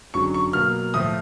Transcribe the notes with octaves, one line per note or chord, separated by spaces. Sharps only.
G#1 F#2 D3 F#3 C#6
C#6
B2 F#3 A#3 F6
A2 F3 A3 D#6